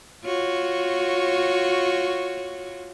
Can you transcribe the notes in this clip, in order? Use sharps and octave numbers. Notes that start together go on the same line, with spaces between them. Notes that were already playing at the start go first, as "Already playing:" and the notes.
F4 F#4 C#5